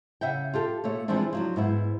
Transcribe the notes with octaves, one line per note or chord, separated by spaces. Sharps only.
C#3 E5 F#5 G5
F4 G4 A4
A#2 A3 C#5
E3 F3 G3 G#3 C4 D4
F3 F#3 D4
G#2 B3 E4